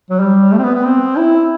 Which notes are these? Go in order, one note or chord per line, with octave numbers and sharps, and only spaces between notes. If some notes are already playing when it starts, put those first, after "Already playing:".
F#3
G3
A3
C4
B3
B3
C4
E4